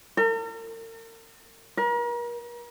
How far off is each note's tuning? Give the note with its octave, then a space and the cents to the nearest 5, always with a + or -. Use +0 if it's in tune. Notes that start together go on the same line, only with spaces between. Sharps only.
A#4 -45
A#4 +40